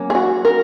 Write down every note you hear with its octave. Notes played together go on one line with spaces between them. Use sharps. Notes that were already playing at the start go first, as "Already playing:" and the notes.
Already playing: F#3 A#3 C#4
G#4
F#4
A#4